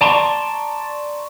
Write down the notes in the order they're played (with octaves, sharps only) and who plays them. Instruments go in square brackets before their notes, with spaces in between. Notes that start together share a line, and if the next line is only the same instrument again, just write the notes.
[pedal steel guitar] D5 A5 A#5 C6 C#6